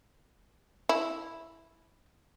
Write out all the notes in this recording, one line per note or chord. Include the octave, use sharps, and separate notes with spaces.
E4